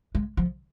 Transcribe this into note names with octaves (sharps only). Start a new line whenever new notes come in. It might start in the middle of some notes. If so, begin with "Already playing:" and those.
G#3
F3